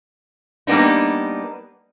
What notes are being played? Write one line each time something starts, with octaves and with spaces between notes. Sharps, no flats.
G3 A#3 B3 D4 D#4